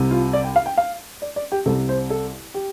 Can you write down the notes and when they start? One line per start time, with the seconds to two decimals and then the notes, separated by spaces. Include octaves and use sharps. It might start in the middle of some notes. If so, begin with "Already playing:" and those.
Already playing: C2 C3
0.11 F4
0.33 D5
0.44 G5
0.56 F5
0.66 G5
0.78 F5
1.22 D5
1.36 D5
1.52 G4
1.66 C2 C3 A4
1.89 C5
2.10 A4
2.54 G4